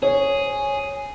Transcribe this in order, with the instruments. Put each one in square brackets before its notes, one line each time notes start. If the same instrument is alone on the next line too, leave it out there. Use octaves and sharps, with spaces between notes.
[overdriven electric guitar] G#4 [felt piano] C#5